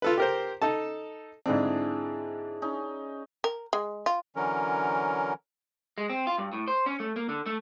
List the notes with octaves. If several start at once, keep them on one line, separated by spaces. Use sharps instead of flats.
F4 A4 B4
G4 A#4 C5
D#4 A4 A5
G#2 D3 C4 D4 E4 G#4
C#4 D#4
A#4
G#3
F4
D3 E3 F#3 C#4 A#4
G#3
C4
F4
G2
A2
C5
C#4
A3
A#3
D3
A3